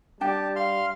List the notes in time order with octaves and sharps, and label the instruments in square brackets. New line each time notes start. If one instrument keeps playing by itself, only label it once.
[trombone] G3 [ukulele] D4 G5 [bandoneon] G4 A5
[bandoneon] F5 C6 F6